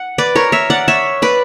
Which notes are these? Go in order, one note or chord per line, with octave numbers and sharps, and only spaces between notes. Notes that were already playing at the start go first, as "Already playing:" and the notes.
Already playing: F#5
B4 D5
A#4 C#5
C#5 E5
D5 F#5
C#5 E5
B4 D5